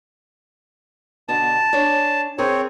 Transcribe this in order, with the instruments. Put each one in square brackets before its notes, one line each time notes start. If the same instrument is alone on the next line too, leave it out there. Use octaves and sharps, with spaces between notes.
[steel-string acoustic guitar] B2 D3 [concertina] A5
[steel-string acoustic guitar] D4 C#5 G#5
[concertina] C4 C#5 [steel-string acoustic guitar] G#4 A#4